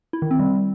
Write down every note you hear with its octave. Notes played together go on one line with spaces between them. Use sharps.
E4
D#3
C4
G3